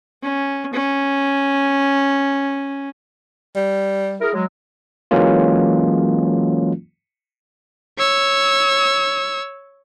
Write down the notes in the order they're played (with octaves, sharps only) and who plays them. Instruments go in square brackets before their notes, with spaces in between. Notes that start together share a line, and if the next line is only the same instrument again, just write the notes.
[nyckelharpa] C#4
C#4
[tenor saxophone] G3
[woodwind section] E4 G#4 A#4
F#3 G#3
[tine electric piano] E3 F#3 G#3 A#3 C#4 F4
[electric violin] C#5 E6